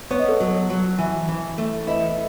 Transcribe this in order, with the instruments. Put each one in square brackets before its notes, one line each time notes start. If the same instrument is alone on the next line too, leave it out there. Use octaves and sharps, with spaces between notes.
[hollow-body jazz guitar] B3 [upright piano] C#5
[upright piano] D#5
A4 C#5
[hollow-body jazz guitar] F#3
F#3
E3
E3
A3
[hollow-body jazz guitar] E4 [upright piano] B4 D#5